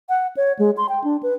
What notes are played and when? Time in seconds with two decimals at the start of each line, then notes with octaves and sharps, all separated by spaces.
0.09 F#5
0.37 C#5
0.59 G#3
0.77 C6
0.89 G5
1.04 D4
1.23 B4